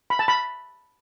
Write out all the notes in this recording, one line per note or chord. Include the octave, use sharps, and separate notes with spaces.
B5
A5
B5